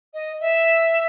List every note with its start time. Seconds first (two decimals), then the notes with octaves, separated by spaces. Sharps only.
0.14 D#5
0.40 E5